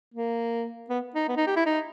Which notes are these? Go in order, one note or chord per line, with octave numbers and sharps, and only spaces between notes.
A#3
B3
D#4
B3
D#4
G4
E4
D#4